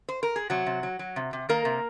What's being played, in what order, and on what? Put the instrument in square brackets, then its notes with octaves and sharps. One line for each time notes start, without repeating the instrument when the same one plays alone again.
[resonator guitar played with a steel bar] C5
A#4
G#4
C3 F#3 F#4
C3
F#3
F#3
C3
C3
D#3 A#3 A#4
C3